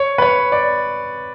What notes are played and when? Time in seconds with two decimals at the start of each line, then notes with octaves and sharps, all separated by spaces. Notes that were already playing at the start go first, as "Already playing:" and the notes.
Already playing: C#5
0.18 B4
0.22 C#5
0.52 D5